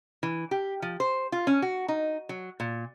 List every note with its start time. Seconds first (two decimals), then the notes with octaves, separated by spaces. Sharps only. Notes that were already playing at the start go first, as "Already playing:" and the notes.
0.23 E3
0.51 G4
0.82 F3
1.00 C5
1.32 F4
1.47 C#4
1.62 F#4
1.88 D#4
2.29 F#3
2.60 A#2